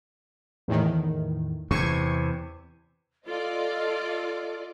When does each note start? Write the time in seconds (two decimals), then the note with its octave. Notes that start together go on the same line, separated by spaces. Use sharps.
0.68 E2 A2 D#3
1.71 E2 C3 C#6 G#6
3.28 F4 A4 D5 D#5